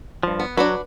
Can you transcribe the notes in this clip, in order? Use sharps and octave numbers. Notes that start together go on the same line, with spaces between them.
G2 F3
B3
F#3 D4 F#4 B4